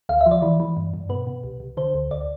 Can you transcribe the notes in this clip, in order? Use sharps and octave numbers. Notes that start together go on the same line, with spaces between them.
D2 F5
E5
F3
D5
E3
E3
G2
G2
B2 B4
B2
C2
C2
D3 C5
D2
D2 D5